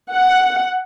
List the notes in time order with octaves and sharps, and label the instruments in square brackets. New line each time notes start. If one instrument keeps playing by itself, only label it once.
[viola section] F#5